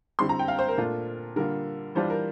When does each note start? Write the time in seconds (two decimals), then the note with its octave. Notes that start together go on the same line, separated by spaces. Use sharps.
0.19 D3 G3 C4 E4 C6
0.29 A#5
0.39 G5
0.48 F5
0.59 C5
0.68 A#4
0.77 A#2 A3 D4 F4
1.36 D3 G3 A#3 F4 A#4
1.95 E3 G3 D4 F4 C5
2.10 A#4